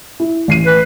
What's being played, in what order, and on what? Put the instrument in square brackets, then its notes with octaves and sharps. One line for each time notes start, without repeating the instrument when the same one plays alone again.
[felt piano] E4
A1 C7 D#7
[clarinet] B4